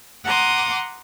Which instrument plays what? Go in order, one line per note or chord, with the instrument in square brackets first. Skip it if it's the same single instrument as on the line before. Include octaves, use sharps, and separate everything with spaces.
[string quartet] F#5 A#5 C6 D6 D#6